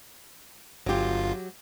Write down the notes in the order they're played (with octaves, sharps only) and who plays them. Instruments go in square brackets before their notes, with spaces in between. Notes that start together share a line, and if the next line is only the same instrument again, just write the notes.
[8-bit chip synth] G1 F4 [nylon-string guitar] F#3 G4